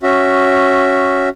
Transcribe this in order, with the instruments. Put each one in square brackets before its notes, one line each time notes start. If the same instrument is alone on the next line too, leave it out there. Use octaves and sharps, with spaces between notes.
[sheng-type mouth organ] C#4 F#4 E5